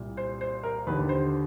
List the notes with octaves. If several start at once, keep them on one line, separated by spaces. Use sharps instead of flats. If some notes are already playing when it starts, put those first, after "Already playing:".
Already playing: C2 A#2
C5
C5
A#4
D#2 D3 B4
C5